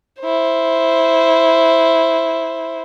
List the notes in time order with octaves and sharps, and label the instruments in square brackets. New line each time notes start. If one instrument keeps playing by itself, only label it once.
[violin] E4 C5